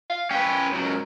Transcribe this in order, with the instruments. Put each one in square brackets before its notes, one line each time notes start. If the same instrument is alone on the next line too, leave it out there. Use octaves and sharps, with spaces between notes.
[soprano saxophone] F5
[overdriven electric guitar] C#4 B4 [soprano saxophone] G5
[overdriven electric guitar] C#2 F#3
[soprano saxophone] A#4